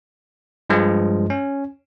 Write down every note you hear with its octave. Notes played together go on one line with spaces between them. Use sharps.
G2 F3 G#3
C#4